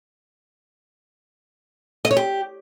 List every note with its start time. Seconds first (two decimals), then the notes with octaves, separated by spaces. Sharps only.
2.05 D#5
2.11 C#5
2.17 G4